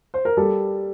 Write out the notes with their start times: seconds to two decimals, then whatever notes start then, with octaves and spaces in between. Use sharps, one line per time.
0.14 C5
0.25 A#4
0.37 G3 A4